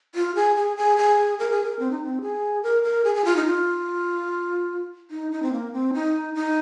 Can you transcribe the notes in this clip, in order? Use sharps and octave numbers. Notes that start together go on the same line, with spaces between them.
F4
G#4
G#4
G#4
G#4
A#4
G#4
A#4
C4
D#4
C4
G#4
A#4
A#4
G#4
G#4
F4
D#4
F4
D#4
D#4
C4
A#3
C4
D#4
D#4